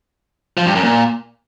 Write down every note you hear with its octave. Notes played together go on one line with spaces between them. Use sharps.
F3
G2
F#2
A#2